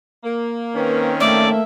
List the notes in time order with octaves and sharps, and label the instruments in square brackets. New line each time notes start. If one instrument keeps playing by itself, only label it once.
[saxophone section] A#3
[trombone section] D#3 C4 C#4 [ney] B4
[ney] A3 [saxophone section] A#3 E5 [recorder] D5